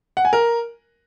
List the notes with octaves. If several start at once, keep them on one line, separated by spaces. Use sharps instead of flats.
F#5
G#5
A#4